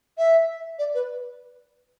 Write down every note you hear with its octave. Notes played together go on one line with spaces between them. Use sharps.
E5
D5
B4